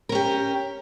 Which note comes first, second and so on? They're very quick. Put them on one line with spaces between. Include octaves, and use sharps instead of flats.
A#4 C#4 G4